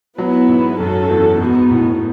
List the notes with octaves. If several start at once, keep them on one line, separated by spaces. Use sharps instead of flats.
F#3 B3 E4 B4
G#2
F#2 C#4 F#4 A4
E2
G#2 B3 D#4 F#4
A2